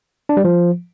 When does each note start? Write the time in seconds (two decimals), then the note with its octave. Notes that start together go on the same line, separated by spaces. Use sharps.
0.29 D4
0.37 G3
0.44 F3